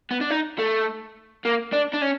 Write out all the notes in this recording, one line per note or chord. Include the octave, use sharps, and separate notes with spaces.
B3
D4
D#4
A3
A#3
D4
D4
C#4